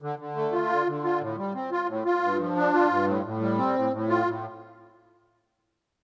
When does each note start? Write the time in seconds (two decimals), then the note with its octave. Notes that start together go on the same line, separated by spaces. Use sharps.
0.02 D3
0.19 D3
0.36 A3
0.52 F4
0.70 D3
0.87 D3
1.04 F4
1.21 A2
1.38 G3
1.55 C4
1.72 F4
1.88 A2
2.06 F4
2.22 G2
2.40 F3
2.56 D4
2.74 F4
2.90 G2
3.07 A2
3.25 A2
3.41 G3
3.58 C4
3.76 A2
3.93 A2
4.09 F4
4.26 A2